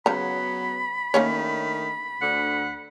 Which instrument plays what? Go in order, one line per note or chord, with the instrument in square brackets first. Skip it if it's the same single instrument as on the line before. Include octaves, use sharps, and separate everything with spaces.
[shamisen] C#3 A#5 [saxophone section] F#3 B3 [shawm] B5
[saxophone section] D#3 A3 D4 [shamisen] A#3 C#4 C#5
[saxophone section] D2 D3 F#5